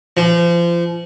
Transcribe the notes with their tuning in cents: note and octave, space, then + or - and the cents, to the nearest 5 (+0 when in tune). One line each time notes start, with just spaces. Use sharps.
F3 -30